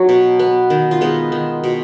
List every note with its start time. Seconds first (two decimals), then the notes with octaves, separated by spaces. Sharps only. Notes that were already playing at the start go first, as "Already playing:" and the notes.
Already playing: F#3 D#4
0.09 B2
0.39 B3
0.70 D#3
0.91 F4
1.01 G#3 B3 D#4
1.32 D#3
1.64 B2